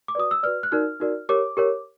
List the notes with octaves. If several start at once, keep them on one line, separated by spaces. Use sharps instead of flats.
D6
F#4 B4 D5 D#6
E6
F#4 B4 D5 F6
F#6
D#4 F#4 A#4 D5 F6
D#4 F#4 A#4 D5
G4 A#4 C#5 D6
G4 A#4 C#5